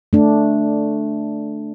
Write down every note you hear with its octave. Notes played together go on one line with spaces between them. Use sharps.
A3 D4